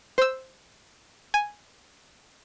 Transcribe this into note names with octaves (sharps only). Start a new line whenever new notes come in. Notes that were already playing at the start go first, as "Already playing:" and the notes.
C5 E6
G#5